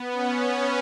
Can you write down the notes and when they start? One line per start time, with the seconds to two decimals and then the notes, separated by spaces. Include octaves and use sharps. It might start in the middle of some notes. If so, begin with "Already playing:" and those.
Already playing: B3
0.12 C#4